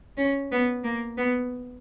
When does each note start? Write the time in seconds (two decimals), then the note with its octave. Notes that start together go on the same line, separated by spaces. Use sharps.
0.17 C#4
0.51 B3
0.84 A#3
1.17 B3